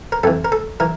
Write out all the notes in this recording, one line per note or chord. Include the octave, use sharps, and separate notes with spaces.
A#4
F2 E3 A4
A#4
A4
E3 A#4